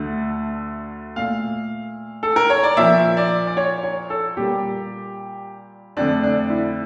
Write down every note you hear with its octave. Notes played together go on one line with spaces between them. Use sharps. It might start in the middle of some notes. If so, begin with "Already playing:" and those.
Already playing: D2 D3 A3
A#2 A3 F5
A4
A#4
C#5
D5
A#2 F3 A#3 E5
D5
D5
C#5
C#5
A4
A#2 G3 A#3 G4
F2 D3 A3 D4
D4
E4